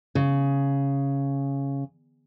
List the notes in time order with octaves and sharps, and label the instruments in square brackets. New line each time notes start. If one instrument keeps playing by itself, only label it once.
[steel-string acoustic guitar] C#3